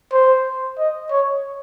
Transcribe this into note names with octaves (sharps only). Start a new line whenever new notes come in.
C5
D#5
C#5